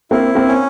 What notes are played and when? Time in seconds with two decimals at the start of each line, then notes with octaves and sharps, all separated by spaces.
0.11 A#3 C4 E4
0.35 A#3 C4
0.48 C#4